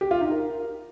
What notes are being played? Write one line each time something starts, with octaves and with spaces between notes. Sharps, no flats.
G4
F4
D#4
A#4